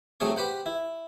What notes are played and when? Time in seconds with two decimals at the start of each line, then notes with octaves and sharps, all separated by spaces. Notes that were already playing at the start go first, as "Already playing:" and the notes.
0.20 C2 F#3 A3 C4 G#4 C#6
0.36 G4 B4 C5 F#5
0.66 E4